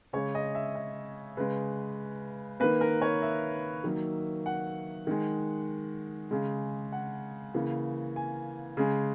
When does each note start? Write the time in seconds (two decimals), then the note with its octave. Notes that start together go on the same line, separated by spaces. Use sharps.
0.13 C#3 G#3 C#5
0.35 D#5
0.55 E5
0.75 D#5
1.37 C#3 G#3 B4
2.60 D#3 A#3 B4
2.81 A#4
3.02 C#5
3.22 E5
3.84 D#3 F#3 A#3
4.46 F#5
5.07 D#3 G#3
6.31 C#3 G#3
6.92 F#5
7.54 C#3 E3 A#3
8.16 G#5
8.77 C#3 G#3